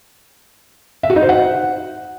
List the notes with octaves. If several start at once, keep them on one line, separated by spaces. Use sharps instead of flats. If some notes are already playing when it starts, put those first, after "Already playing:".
E5
F#4
D#4
C5
F#5